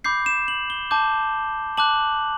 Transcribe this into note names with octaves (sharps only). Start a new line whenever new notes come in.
B5 D6 G6 C7
E7
F#7
G7
A5 D6 G6
A5 D6 F#6 F#7